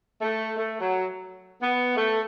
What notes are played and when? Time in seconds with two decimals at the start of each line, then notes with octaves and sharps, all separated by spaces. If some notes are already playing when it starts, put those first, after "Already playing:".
0.21 A3
0.57 A3
0.80 F#3
1.61 B3
1.96 A3